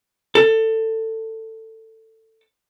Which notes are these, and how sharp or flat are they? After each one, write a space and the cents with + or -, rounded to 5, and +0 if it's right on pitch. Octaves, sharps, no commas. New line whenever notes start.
A4 +20